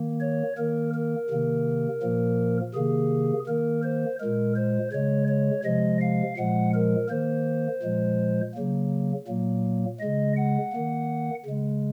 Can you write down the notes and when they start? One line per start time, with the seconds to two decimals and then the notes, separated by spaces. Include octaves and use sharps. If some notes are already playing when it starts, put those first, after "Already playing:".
Already playing: D#3 A#3
0.21 C#5
0.58 D#3 A#3 A#4
0.94 A#4
1.30 C3 D#3 A#3
2.02 A#2 F3 A#3
2.74 C3 D#3 A#3 G#4
3.47 D#3 A#3 A#4
3.84 C5
4.20 A#2 G#3 A#4
4.56 C5
4.92 C#3 G#3 C#5
5.28 C#5
5.64 C3 F3 G#3 D#5
6.02 F5
6.38 A#2 F3 G#3 F#5
6.74 A#4
7.09 D#3 A#3 C5
7.83 A#2 F3 G#3
8.55 C#3 F#3 A#3
9.28 A#2 F#3 A#3
10.00 C#3 G#3 D#5
10.37 F#5
10.73 D#3 A#3
11.45 C#3 G#3